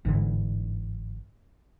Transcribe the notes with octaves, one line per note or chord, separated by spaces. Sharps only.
G1 G#2 D3 E3